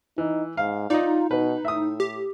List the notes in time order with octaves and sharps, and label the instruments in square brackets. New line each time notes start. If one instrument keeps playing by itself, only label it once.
[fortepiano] E3 [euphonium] D#4
[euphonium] G#2 [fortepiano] F5
[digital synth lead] D#4 [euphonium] F4 [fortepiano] D5 D#5
[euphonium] B2 [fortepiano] B4
[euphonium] A2 [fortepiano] E5 D#6
[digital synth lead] G4